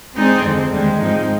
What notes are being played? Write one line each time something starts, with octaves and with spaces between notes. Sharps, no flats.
G#3 C4 D#4 G#4 D5
F2 D3 G#3
D#2 D3 G3 G#3 D4
G#2 F3 C4 D#4